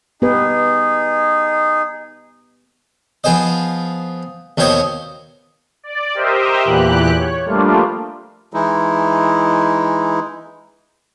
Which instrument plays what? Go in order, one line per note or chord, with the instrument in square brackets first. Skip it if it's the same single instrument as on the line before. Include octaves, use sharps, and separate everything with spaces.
[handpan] B3 G4 B4 [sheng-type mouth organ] D#4 G#4
[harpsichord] F3 B3 G#4 C5 D#5
D#2 B2 C4 C5 C#5 D#5
[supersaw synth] D5
G4 A#4 C5 D#5 E5
E2 A#2 E3 G4 F#6
C#5
F3 G3 A3 A#3 D4 F4
[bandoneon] E3 G#3 D#4 E4